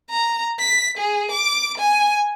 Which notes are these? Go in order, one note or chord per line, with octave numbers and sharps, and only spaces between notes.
A#5
B6
G#4
D6
G#5